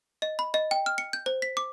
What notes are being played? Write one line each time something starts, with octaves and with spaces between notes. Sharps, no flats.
D#5
B5
D#5
G5
F6
C#7
G6
C5
B6
D6